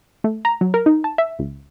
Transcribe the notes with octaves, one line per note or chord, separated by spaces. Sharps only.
A3
A#5
F#3
A#4
D#4
A5
E5
C#2